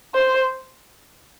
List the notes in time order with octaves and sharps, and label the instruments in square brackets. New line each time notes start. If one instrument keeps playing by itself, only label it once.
[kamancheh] C5